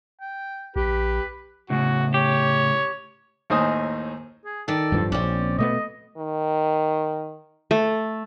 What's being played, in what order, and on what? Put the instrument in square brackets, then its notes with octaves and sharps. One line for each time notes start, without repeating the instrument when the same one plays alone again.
[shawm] G5
[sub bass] A#1 [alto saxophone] G4 [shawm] B4
[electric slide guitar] A2 C#3 [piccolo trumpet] F#4
[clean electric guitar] G4 [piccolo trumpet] C#5
[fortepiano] D#2 A2 D#4 C5 G#5 D#6
[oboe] G#4
[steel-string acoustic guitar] D#3 D5 [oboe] A4
[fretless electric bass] D1 G2 F3
[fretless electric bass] A#1 [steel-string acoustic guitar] C4 C#4 [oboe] D5
[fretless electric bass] B2 A3 B3 [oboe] D#5
[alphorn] D#3
[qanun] A3